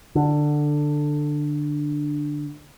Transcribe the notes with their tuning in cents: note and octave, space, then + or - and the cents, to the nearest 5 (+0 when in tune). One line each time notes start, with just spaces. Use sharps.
D3 +10